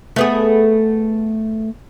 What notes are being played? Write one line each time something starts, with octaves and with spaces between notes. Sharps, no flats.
A3 B3 G#4